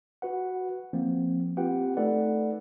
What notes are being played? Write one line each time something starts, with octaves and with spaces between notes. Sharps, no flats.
F#4 B4 F#5
F3 A#3 C4
C4 F4 G4 B4 F#5 G5
A3 D#4 A4 B4 D5 F#5